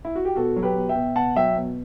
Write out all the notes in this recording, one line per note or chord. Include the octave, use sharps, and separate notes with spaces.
E4
F#4
G4
B2 F#4 A4
F#3
G4 B4
B2
E5 G5
B2
B2 F#5 A5
F#3 E5 G5
B2